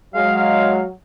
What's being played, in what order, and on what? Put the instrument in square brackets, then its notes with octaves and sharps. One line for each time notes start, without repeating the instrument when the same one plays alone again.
[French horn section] F#3 [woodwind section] G#3 F5